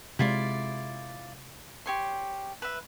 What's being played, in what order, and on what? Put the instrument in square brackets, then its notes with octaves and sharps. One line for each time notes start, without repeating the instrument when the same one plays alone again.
[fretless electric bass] C3 G#3 [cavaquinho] E4 F4 D5
[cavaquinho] G4 C#5 C6
B4 E5